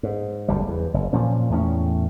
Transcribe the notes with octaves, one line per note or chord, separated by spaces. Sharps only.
G#2
F#1 D2 G3
E2
F#1
A#2 F3 C#4
E2 A2 C#4